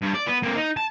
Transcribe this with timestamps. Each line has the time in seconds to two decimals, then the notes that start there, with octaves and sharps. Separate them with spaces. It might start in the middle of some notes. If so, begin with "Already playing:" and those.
0.02 G2
0.14 D5
0.27 B3
0.43 A#3 C4
0.56 D#4
0.77 A5